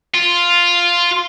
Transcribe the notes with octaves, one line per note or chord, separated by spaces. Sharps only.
F4